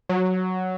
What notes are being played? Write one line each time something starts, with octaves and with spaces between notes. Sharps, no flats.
F#3